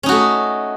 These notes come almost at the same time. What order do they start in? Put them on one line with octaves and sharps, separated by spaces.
C#4 D#4 F#4 A3